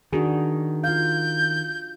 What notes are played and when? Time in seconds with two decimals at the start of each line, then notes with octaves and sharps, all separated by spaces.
0.13 D#3 D4 F#4 G#4
0.84 F4 F5 G6